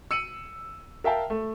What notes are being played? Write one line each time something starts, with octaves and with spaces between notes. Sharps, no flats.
E6 C#7 D#7 F#7
A#4 E5 F5 G5 A5
A3